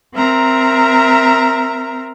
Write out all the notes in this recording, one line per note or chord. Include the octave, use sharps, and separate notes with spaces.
C4 A#4 E5 A#5